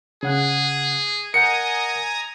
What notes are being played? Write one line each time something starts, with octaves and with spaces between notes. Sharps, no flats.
C#3 G#4 F#5 F#6
A#4 D#5 F#5 G#5 A#5 D#6 G6 C#7